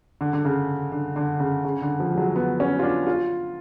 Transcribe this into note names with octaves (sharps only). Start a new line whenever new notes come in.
D3
D3
C#3
D3
D3
C#3
C#3
D3
F3
G#3
F#3
B3
C#4
F4
D4
F4